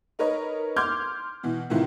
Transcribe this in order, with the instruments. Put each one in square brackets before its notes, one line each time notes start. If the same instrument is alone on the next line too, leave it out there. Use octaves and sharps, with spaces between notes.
[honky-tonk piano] D#4 A#4 B4 C#5 D#5
C6 D6 F6 G6 G#6
B2 E3
A2 C3 D#3 E3 E4 F4